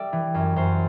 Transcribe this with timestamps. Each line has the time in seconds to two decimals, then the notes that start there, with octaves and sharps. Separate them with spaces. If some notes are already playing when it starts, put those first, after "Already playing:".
Already playing: G3 D5 E5
0.13 E3
0.34 F#2
0.56 F#2 C5